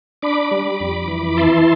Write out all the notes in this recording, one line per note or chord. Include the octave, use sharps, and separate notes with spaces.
D4 B5 D6
G3
F2
E3
E4 A5 C6